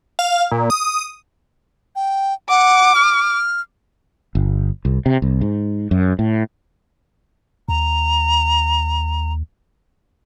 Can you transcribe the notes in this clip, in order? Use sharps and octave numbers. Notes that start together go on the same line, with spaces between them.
F5
A#2
D#6
G5
F#5 D6
F6
G1
C2
C3
C2
G#2
F#2
A2
D#2 A#5